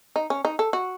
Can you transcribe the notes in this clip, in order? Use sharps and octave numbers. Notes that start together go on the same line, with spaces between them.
D#4
C#4
D#4
A4
F#4